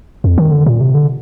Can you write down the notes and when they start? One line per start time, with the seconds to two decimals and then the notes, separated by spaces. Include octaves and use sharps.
0.24 F2
0.38 D#3
0.51 D3
0.66 A#2
0.81 C3
0.95 D3